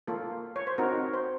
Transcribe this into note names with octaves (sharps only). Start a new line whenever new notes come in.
A#3 F4 A4
C#5
C5
C4 D#4 F#4 A#4
C5